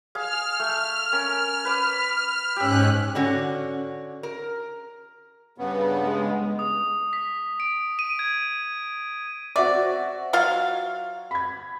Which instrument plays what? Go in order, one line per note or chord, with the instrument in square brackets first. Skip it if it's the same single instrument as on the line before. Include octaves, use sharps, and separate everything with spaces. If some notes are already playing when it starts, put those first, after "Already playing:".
[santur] G#4 F5 [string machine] F6
[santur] A3
C#4 A#4
B4 D6
[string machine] G#2 C#4 F#6 [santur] G4 E6
[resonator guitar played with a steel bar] D3 C#4 F#4
A#4
[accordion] G2 C#3 B3
[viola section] G#3
[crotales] D#6
B6
D7
D#7
G#6
[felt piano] C4 F#4 E5 [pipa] D5
[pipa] F#3 F4 F5
[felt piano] B5 G#6